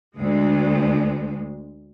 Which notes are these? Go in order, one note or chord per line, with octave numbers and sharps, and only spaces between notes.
D2 G#3